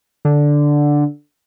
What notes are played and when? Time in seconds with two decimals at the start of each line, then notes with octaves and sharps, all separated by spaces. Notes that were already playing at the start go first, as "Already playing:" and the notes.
0.25 D3